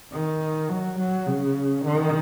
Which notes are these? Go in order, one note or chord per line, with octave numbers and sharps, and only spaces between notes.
D#3
F#3
F#3
C#3
D#3